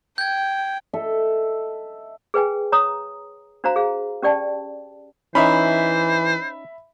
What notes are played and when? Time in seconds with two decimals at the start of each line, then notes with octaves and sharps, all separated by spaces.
0.18 G5 G6 G#6
0.93 A4 D#5 E5
2.34 G#4 B4 G5 G#5
2.72 C#5 A#5 D#6
3.64 D4 F#4 C5 F5 A#5
3.76 G#4 F5
4.22 C#4 G4 D5 G5 A5
5.35 E3 C#4 D#4 C5 E5 B5